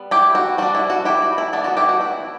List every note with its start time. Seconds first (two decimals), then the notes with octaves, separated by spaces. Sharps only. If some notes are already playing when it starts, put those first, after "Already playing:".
Already playing: G3 B3
0.11 E4 G4
0.35 F#4
0.58 G3 D4 F#4
0.75 E4
0.90 F#4
1.05 E4 G4
1.22 F#4
1.38 E4
1.53 E3 B3 D4 E4
1.64 F#4
1.77 E4 G4
1.89 F#4
2.01 E4